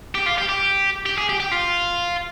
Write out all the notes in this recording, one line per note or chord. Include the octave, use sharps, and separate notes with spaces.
G4
F4
G4
G4
G4
G#4
G4
G4
F4